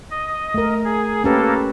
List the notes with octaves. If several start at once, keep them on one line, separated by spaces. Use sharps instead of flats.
D#5
A3 A#4
G#4
A#3 C#4 G4 A4 B4